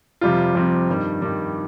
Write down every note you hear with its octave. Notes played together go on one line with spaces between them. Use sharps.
F2 C3 G3 C4 F4
F2 C3 G3 C4 F4
G2 D#3 G3
G2 D#3 G3